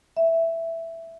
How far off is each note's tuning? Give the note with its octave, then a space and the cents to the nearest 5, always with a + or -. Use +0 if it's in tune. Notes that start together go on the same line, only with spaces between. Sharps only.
E5 +5